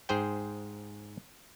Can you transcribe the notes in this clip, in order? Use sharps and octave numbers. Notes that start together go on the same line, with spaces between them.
G#2 G#4 C5 G5